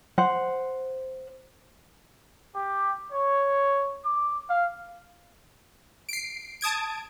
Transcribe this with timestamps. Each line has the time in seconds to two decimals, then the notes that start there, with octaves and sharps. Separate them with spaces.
0.18 C5 F#5
2.54 G4
3.11 C#5
4.05 D6
4.49 F5
6.09 C7 D7
6.61 A5 D#6 G#6 D7